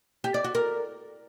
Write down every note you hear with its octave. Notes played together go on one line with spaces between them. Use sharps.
G4
D5
F#4
A#4